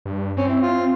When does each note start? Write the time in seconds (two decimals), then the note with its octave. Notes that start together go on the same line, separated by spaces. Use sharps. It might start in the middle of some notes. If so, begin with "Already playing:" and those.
0.06 G2
0.37 C4 C#4
0.49 E4
0.62 F4